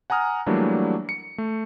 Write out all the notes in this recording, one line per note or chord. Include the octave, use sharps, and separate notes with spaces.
F#5 G#5 A#5 D#6 F6
E3 F#3 G3 A3 A#3 D4
C#7
A3